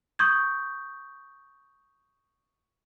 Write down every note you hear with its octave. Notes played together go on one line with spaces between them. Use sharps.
C#6 D#6 G6 G#6